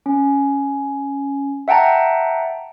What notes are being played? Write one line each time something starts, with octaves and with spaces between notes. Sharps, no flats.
C#4
E5 F#5 G5 A5 A#5